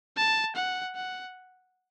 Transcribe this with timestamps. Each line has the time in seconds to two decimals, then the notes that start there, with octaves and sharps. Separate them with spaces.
0.17 A5
0.56 F#5
0.95 F#5